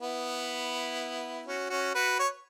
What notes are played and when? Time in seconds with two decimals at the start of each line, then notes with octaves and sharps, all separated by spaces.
0.01 B3 E4
1.46 C#4 F#4
1.70 C#4 F#4
1.95 F#4 B4
2.19 C#5